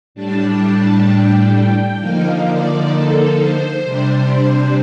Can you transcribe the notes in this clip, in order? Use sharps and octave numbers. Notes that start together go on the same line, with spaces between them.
A2 G3 D4 A5
A5
G5
D3 F3 A#3 D#4 F5
D5
A4
C5
C3 G3 D4